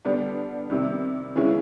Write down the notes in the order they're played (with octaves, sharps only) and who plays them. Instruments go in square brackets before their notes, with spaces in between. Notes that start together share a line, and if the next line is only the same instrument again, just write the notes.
[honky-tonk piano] D3 G3 B3 D4
C3 D#3 G3
C#3 E3 G#3 C#4 E4